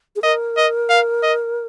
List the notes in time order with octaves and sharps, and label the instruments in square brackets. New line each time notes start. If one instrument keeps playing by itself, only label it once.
[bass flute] G#4
[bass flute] A#4 [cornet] D#5
[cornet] D#5
F5
D#5